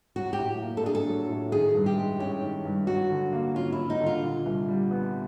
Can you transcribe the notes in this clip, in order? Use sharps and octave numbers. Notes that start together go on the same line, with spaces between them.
F#3 F#4
G4
A2
A#3
A4
D4 G#4
A4
F#3
A2
D#3 G#4
G2
G4
G#3
C#4 G4
D#3
G2
F#3 F#4
D3
A#3
C#4 F4
E4
F#3
D#4
D3
F4
A#2
C2
G3
B3